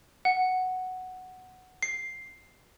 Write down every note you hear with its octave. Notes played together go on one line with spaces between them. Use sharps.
F#5
C7